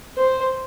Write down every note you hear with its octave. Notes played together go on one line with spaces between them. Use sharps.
C5